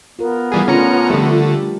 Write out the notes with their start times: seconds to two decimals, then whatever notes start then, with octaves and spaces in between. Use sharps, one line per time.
0.19 B3 F4 A#4
0.52 E3 G3 G#4
0.68 C#3 A3 C#4 D4 F4 A#5 C#7
1.10 D3 F3 G3 A3 G4